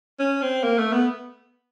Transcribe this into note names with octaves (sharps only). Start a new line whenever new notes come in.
C#4
C4
A#3
A3
B3